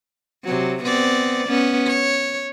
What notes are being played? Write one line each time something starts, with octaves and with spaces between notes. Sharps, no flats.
C3 F#3
B3 C4 D5
B3 C#4
C#5